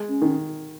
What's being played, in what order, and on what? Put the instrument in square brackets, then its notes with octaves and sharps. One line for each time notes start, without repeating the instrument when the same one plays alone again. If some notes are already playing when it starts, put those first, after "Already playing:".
Already playing: [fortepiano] G#3
[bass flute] C#4
[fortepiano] D#3